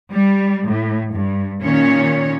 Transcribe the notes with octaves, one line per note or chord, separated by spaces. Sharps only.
G3
A2
G2
A#2 D#3 C#4 C#5